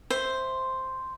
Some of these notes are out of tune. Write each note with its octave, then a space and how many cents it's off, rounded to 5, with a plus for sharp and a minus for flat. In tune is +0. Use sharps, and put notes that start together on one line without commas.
C5 +0 E5 +0